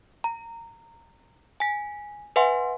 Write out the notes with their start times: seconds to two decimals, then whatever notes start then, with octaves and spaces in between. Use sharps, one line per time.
0.24 A#5
1.60 G#5 B6
2.36 B4 E5 F#5 G#5 C6